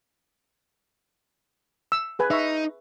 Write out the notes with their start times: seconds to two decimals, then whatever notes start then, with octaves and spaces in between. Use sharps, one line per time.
1.92 E6
2.19 G#4 B4 G#5
2.31 D#4 E5 C#6